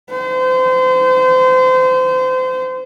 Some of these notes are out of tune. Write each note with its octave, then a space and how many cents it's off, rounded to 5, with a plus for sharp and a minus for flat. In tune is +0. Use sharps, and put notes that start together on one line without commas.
C5 -30